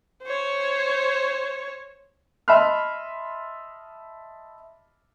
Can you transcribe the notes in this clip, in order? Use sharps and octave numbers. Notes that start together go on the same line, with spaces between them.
C5 C#5
D#5 E5 A5 B5 C6 F6